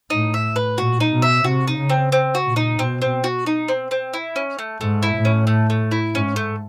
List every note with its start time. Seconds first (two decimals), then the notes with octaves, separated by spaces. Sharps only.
0.10 A2 D#4
0.34 E5
0.56 B4
0.78 A#2 F#4
1.00 D#4
1.11 B2
1.22 E5
1.44 C3 F#4
1.68 D#4
1.79 C#3
1.90 C4
2.12 C4
2.35 F#4
2.45 A#2
2.56 D#4
2.79 B2 C4
3.02 C4
3.24 F#4
3.46 D#4
3.68 C4
3.91 C4
4.14 E4
4.36 C#4
4.59 A3
4.81 G#2 A3
5.03 E4
5.14 A2
5.25 C#4
5.47 A3
5.70 A3
5.91 E4
6.14 G#2 C#4
6.36 A3